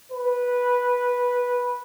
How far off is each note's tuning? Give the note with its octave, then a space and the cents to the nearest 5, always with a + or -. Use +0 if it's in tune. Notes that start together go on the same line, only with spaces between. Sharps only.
B4 -10